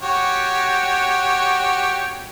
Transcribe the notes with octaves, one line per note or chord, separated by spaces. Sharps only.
F#4 G4 C#5